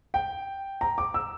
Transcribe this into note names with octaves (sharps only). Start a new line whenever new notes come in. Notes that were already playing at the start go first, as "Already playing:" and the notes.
G5
A#5
D6
E6